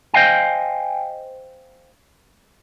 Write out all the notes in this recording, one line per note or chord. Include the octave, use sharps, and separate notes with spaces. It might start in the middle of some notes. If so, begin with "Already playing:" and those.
C5 D#5 F5 G5 G#5